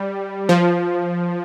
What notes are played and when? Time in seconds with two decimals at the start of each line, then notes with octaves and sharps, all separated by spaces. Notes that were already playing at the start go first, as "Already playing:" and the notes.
Already playing: G3
0.49 F3